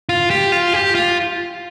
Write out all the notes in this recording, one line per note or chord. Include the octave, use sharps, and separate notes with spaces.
F4
G4
F4
G4
F4